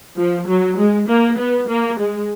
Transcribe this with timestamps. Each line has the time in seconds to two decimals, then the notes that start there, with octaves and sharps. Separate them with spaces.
0.17 F3
0.48 F#3
0.77 G#3
1.09 A#3
1.38 B3
1.69 A#3
2.00 G#3